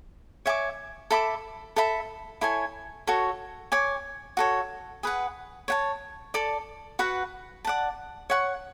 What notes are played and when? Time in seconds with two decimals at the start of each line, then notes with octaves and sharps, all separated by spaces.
0.46 C#5 E5 G#5 D6
1.11 A4 E5 B5 D6
1.76 A4 E5 B5
2.41 E4 A4 C#5 G#5
3.07 F#4 A4 C#5
3.72 C#5 G#5 D6
4.37 F#4 A4 C#5
5.03 G#4 B4 F#5
5.68 C#5 F#5 A5
6.34 A4 D5 A5
6.99 F#4 B4 F#5
7.65 D5 F#5 A5
8.30 C#5 F#5 C#6